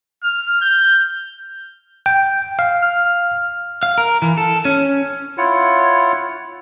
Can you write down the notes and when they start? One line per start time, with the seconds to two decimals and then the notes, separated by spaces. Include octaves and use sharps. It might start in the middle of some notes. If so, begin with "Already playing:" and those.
0.24 F6
0.61 G6
2.06 G5
2.59 F5
2.82 F6
3.83 F5
3.98 A#4
4.22 E3
4.38 A4
4.65 C#4
5.38 E4 F4 C#5 F#5